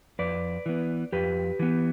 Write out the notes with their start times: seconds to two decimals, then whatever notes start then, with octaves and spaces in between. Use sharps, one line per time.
0.19 F2 B4 D5
0.66 E3 B3
1.12 F2 G4 B4
1.59 E3 B3